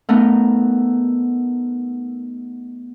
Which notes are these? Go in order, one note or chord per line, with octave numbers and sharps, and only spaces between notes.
A3 B3 D#4 A#4